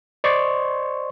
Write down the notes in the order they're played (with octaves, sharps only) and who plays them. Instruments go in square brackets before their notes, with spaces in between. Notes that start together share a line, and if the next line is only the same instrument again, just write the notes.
[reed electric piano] C5 D5 D#5 C6 C#6